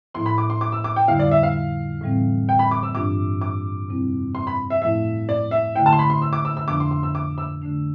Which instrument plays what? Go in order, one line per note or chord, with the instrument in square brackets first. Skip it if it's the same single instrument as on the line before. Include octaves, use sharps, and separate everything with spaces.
[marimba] A2 F3 B3 E4 [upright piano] C6
[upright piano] B5
D6
C6
D6
E6
D6
G5
[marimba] F2 D3 G3 B3 E4 [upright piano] F5
[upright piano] D5
E5
F5
[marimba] A2 E3 G3 C4
[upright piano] G5
B5
D6
E6
[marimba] G2 E3 B3 D4 F4 [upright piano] D6
[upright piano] D6
[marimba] F2 C3 G3 C4 E4
[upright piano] C6
B5
E5
[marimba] A2 F3 A3 E4 [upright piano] E5
[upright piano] D5
E5
[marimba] D3 A3 E4 [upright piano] G5
[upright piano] A5
C6
B5
C6
E6
D6
E6
E6
[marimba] F2 D3 F3 B3 D4 [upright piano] D6
[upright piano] C6
C6
E6
D6
E6
[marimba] D3 A3 D4